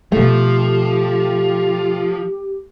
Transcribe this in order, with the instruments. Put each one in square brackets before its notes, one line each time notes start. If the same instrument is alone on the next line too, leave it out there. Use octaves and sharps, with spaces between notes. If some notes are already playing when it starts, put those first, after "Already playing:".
[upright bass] B2 D3 [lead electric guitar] F3 [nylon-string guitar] A3 [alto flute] G4